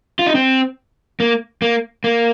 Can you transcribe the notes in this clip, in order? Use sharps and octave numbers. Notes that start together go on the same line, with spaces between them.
F4
D#4
C4
A#3
A#3
A#3